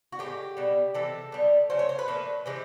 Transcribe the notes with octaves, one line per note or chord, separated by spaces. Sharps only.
F#4
A2 F3 G#3 G4
B2 G3
C3 E3 G#3 A4
B2 G3
C#3 F#3 A3 C5
C#5
C5
B4
A#2 F3 A3
C3 E3 G#3 C5